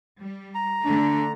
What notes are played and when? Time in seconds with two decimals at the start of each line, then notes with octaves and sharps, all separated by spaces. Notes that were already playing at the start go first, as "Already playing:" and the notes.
0.20 G3
0.55 A#5
0.85 D3 A3 D4